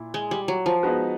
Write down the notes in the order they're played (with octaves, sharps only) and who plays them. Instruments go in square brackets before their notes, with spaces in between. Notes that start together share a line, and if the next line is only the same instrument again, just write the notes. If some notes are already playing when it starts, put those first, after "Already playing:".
Already playing: [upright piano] A#2 E4
[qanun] G#3
G3
F#3
F3
[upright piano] G#3 B3 D#4 F#4 B4